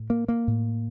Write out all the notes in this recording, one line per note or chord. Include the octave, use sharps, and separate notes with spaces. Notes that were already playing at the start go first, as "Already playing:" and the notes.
Already playing: A2
A#3
A#3
A2